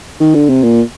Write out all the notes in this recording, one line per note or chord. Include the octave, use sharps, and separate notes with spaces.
D#3
D3
C3
A#2